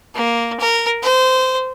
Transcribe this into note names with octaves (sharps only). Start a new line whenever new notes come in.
A#3
A#4
C5